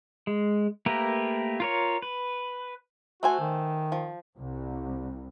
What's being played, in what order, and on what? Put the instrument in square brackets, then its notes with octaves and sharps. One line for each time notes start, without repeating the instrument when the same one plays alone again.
[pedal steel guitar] G#3
A3 A#3 G4 A#4 B4
F4 A#4 C#5
B4
[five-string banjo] A3 C5 G#5 [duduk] F#4
[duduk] D#3
[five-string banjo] F3
[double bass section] C2